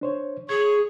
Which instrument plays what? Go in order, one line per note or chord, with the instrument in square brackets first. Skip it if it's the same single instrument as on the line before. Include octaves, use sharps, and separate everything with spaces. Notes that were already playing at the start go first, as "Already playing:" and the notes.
[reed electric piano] D4 C5 C#5
[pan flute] G#4 [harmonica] C#5 [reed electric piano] G#6